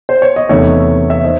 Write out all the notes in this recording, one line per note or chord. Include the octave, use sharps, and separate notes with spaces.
C5
C#5
D#5
E2 C3 D#3 A3 C#5 E5
E5
D#3 C5 D#5